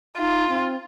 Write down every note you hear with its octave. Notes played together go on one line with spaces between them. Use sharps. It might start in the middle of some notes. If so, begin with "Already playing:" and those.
D#4 F4
C4